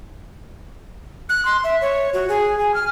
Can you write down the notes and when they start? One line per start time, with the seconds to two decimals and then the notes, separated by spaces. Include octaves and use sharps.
1.29 F#6
1.45 C6
1.64 E5
1.81 C#5
2.13 F#4
2.28 G#4
2.59 G#5
2.74 F6